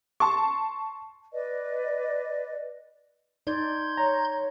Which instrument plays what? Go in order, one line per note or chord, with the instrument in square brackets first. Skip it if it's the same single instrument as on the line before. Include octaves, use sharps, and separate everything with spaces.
[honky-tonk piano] A5 C6 C#6
[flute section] B4 D5 D#5
[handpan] D#4 D5 [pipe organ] C6 G6 G#6
[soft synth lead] C#5 [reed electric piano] A#5